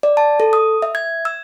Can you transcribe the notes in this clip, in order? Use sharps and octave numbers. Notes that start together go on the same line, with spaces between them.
D5
A5
A4
D#6
E5
G#6
E6